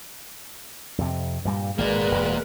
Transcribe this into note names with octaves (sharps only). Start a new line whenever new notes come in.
F2 C3
G2 A#2 G3
G#1 G#3 A#3 A#4 B4 D5
E1